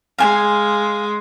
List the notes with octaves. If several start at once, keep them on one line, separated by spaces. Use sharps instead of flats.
G#3 F5 G#5